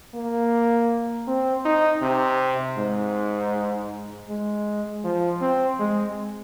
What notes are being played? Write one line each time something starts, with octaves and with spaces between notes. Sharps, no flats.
A#3
C4
D#4
C3
G#2
G#3
F3
C4
G#3